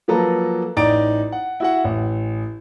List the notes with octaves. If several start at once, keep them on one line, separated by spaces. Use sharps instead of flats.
F3 F#3 A#3 A4 B4 A#5
A1 D#4 D5 A#5 A6 D7
F#5
E4 F#4 F#5
A1